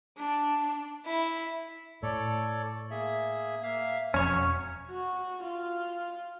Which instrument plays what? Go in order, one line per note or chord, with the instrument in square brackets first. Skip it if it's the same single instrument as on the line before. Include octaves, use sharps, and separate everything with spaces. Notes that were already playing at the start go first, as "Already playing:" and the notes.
[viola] D4
[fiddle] E4
[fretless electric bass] A2 [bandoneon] A4 C#5 D5
[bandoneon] A#3 G#4 E5
A#3 E5 F5
[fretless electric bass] E1 F2 [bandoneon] F#3 [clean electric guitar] C#4 C#5
[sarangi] F#4
F4